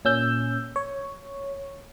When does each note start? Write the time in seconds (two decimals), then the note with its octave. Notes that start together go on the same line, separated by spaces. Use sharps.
0.05 A#2 C#4 E6 G6
0.76 C#5